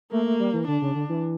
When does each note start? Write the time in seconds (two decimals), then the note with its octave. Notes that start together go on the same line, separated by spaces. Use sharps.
0.12 A3 A#3
0.26 A3
0.40 G3
0.53 E3
0.67 D3 D4
0.81 C#3
0.95 D3
1.09 E3